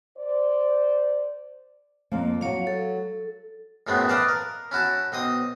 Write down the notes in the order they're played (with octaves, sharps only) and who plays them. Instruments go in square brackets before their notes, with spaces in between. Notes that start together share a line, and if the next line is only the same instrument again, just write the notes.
[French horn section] C5 D5
[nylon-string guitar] F2 A#3 F5
[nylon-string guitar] F#3 F#4 [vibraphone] C#5 F5
[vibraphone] A4
[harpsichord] F#2 A2 G#3 A3 B3 C4
B4 D5 D#5 F5 A5
A#4
C#4 E4 F#4 A5
B1 C4 D#5 D#6